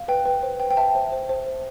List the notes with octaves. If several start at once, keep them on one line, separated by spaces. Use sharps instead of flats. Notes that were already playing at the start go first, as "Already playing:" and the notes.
Already playing: F5
B4 G5
B4
C5
G5
G5
E5 A5
C5
C5
C5
C5